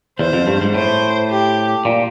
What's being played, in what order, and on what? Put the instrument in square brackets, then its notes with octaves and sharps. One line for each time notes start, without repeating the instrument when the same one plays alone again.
[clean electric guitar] E2 [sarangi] C5
[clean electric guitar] F2
G2
G#2
[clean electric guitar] A2 [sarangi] C5
[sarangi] G4
[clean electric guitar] A#2